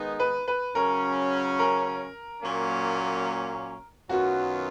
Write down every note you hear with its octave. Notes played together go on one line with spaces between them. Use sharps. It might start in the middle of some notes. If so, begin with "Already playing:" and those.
Already playing: D#3 G#3 B3 D#4
B4
B4
C#3 F#3 C#4 A#4
A#4
A#2 F#3 A#3 C#4
F#2 D#3 F#3 B3 F4 F#4